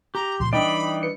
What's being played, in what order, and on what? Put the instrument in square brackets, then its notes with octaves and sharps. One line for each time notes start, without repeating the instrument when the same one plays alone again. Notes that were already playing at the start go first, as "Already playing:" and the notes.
[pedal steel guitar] G4 [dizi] A#5
[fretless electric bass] C#2 A#2 F3 [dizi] C6
[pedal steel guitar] E3 D#4 D5 [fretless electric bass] G3 D4 [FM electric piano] D#5 G5 [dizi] B5
[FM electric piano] B4 C#7